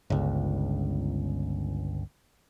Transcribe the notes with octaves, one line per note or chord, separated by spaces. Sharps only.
G1 C#2